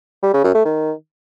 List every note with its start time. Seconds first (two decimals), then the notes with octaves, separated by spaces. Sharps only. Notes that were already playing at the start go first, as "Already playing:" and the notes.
0.23 G3
0.34 C#3
0.44 F#2
0.55 A3
0.65 D#3